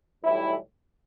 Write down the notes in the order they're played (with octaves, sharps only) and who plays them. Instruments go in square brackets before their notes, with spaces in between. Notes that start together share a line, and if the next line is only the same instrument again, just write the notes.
[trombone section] B1 A2 E3 G3 E4